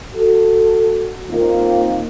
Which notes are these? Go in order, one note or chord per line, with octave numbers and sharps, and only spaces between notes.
F#4 A4
D#3 A#3 C4 D#4 F4